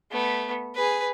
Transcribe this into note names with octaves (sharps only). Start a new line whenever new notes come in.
A3 B3
G#4 B4